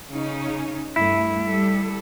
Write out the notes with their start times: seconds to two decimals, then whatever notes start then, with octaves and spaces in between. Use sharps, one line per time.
0.10 C#3 C#4 D#4
0.96 G2 A3 E4
1.45 G3 A4